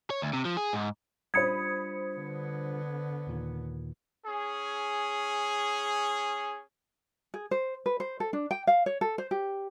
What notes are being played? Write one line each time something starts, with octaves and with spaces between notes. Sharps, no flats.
C#5
D2
C3
F3
G#4
G#2
G3 D4 F4 C5 B5 D#6 G#6 C#7
D3 B3
D#2 A#2 D#3
C#4 G#4
G#4
C5
B4
C5
A4
D4
G5
F5
C#5
A4
C5
G4